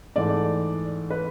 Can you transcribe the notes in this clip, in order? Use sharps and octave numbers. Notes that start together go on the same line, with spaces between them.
G#2 E3 A3 D5
B4